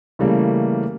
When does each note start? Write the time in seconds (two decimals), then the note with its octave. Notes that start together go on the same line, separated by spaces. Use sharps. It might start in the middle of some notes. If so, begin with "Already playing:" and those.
0.19 C#3 E3 G3 A3 A#3